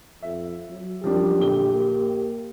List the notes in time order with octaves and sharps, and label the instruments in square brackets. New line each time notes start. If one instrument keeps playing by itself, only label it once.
[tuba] F2 [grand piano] E5
[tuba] F#3
[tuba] F#2 [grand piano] F3 G3 D4 [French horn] G4
[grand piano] A#1 G7 [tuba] D3
[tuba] A#3